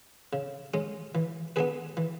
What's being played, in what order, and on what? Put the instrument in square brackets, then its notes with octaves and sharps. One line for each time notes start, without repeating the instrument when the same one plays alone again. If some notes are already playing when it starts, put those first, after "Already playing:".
[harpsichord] C#3
G#3 C#4
E3
B3 D4 G#4 B4
E3